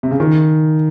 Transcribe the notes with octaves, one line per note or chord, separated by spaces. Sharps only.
C3
C#3
D#3